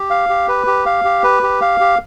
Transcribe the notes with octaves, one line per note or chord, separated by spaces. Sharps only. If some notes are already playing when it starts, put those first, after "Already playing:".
Already playing: G4
F5
G4
B4
G4
F5
G4
B4
G4
F5
G4